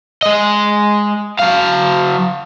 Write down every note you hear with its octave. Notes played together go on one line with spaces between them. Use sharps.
G#3 D#5
F#3 F5